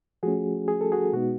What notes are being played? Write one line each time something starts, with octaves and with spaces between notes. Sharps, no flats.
F3 A3 C#4 F#4 G#4
G#4
A4
F#4 G#4
B2 G#3 B3 D#4 F#4